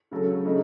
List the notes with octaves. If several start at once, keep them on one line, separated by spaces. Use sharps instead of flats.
C#3 F#3 A3 C#4 A4
C#3 A3 D#4